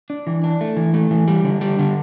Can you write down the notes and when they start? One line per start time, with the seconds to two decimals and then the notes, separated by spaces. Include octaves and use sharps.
0.10 D4
0.27 E3
0.44 D4
0.61 A3
0.77 E3
0.94 A3
1.11 E3
1.28 G3
1.44 D3
1.61 G3
1.79 D3